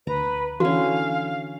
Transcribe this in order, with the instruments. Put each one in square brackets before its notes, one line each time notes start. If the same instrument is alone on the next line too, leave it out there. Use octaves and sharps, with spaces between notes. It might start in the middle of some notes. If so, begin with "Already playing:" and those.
[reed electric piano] D2 [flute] B4 [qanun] A#5
[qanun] D3 C#4 [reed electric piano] E3 [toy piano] F#4 [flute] F5